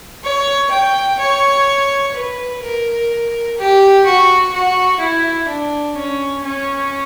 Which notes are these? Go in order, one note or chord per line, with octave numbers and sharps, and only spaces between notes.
C#5
G5
C#5
B4
A#4
G4
F#4
F#4
E4
D4
C#4
C#4